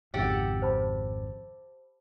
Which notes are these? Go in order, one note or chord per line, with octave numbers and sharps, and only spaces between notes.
G#1 F2 C#3 G4 A4 F#5
C5 A5 B5